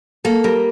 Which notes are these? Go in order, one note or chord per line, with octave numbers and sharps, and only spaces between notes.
A#3 A4
G3 A#4